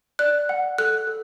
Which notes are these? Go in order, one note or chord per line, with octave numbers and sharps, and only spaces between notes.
D5 F#6
F#5
A4 F#6
A4